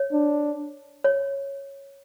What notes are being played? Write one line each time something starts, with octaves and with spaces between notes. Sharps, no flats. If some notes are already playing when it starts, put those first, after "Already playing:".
Already playing: C#5
D4
C#5